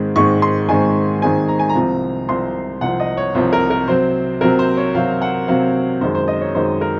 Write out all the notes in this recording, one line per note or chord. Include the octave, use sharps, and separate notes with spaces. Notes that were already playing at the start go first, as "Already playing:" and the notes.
Already playing: G#2 D#3 G#3 C4
G#2 D#3 G#3 C4 C#6
C6
G#2 D#3 G#3 C4 G#5
G#2 D#3 G#3 C4 G#5
A#5
G#5
A#5
C2 C3 F3 C4
C2 C3 F3 C4 C6
C2 C3 F3 C4 F#5
D#5
C#5
C2 C3 F3 C4 C5
A#4
A#4
C3 F#3 C4 C5
C3 F#3 C4 A#4
C5
C#5
C3 F#3 C4 F5
F#5
C3 F#3 C4 F5
F#2 D#3 G#3 C5
C5
D#5
C#5
F#2 D#3 G#3 C5
A#4